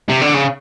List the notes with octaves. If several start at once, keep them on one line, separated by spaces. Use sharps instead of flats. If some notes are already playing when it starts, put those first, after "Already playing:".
C3
D3
C#3